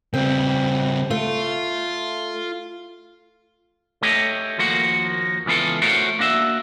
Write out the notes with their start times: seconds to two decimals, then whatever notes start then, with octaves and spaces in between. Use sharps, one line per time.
0.14 C#3 G3 C4
1.11 A3 F4
4.03 A3 G4 C#5 D#5
4.58 D#2 F3 A#3 F#4
5.46 C#2 E3 B3 F4 A4
5.82 A3 F#4 A#4 C5 C#5
6.19 A#3 D4 F#4 E5